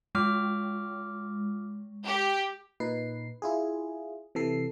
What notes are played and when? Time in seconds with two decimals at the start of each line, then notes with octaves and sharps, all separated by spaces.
0.15 G#3 F4 D6 F6
2.05 G4
2.80 A#2 D#4 B4 C7
3.42 E4 F4 G#4
4.35 C3 E3 A4 C7